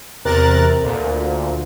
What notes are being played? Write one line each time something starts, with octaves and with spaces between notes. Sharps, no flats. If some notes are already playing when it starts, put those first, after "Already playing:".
E2 C3 A#4 F#6 A6
D2 A#2